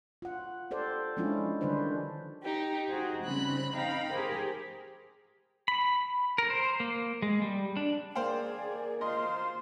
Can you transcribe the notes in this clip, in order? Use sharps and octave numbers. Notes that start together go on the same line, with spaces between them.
F4 F#5
G4 A4 C5 D5
F3 G#3 C#4 D4 E4 F4
D3 D#3 G3 D4 B4 C5
D#4 G4
D#4 F#4 G#4 C5
C#3 G3 C4 B5 F#6
C4 D#4 F5 G5 A#5 B5
G4 G#4 A#4 C5
B5
A#4
C5
A#3
G#3
G3
D4
A#3 G#4 C5 D5 F5 G5
F4 A#4 C5 D#5 C6